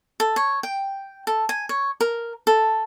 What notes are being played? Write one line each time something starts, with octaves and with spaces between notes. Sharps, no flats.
A4
C#5
G5
A4
G#5
C#5
A#4
A4